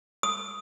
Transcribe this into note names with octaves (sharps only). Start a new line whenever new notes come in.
D#6